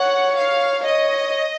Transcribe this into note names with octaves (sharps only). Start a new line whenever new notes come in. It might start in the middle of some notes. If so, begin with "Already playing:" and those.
Already playing: C#5 F#5
F5
C#5 D#5